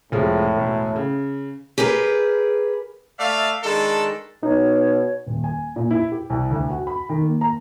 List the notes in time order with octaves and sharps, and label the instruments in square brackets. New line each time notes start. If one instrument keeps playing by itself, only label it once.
[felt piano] F1 F3 G#3 [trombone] A2
[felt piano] E1
C#3
[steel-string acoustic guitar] G4 G#4 A#4 B4
[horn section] A3 D5 E5 F5
D#3 G#3 D4 A4
[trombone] B2 [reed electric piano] D#4 [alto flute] C#5
[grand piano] D#1
G#5
A#2
E4
G4
C2
D2
F#4
B5
D#3
A#3
A#5